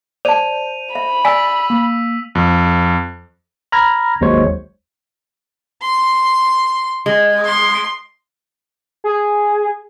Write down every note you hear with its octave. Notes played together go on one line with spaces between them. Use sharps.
C5 D5 A5 D#7 F7
E5 B5
D5 G#5 E6 B6
A#3
F2
A#5 B5 F6 G#6 A#6
G#1 D#2 F#3 G#3 C5 C#5
C6
G#3
C6
G#4